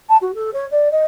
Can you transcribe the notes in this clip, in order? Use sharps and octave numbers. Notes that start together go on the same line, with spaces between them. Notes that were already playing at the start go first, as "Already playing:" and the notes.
A5
F#4
A4
C#5
D5
D#5